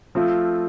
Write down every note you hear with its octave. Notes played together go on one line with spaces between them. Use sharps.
F3 A3 C4 F4